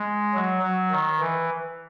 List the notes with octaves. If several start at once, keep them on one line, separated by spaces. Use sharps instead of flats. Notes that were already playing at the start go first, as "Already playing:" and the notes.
Already playing: G#3
F#3
F#3
D#3
E3